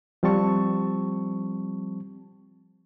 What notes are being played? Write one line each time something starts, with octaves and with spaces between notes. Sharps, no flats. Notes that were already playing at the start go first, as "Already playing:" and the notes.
F3 G3 C4 A5 C#6